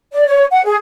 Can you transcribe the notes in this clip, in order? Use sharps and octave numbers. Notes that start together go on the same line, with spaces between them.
D5
C#5
F#5
G#4